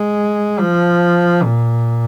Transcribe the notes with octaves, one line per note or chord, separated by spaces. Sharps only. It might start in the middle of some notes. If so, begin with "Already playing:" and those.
Already playing: G#3
F3
A#2